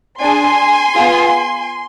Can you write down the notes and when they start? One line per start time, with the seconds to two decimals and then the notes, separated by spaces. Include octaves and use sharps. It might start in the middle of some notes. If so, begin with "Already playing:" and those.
0.20 D4 G#4 G#5 C6
0.94 B3 F4 G#4